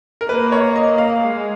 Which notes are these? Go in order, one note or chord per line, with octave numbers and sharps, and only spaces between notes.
A#4
A#3 B4
C#5
D#5
F5
G#3